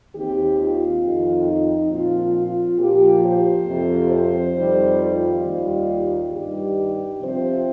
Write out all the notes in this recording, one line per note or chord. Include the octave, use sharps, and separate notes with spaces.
D#2 D#3 C4 G4
F4
F2 D#3 C4
D#4
A#2 F3 C4 F4
F4
A#2 F3 A#3 G4
C5
F2 C3 F3 C4
C5
F2 D#3 G3
F4
D#2 D#3 G3
G2 D#3 G3 G4
C3 F3 C4 C5